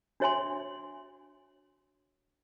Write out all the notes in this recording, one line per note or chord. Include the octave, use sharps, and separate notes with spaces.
D4 F#4 C#5 E5 G#5 C6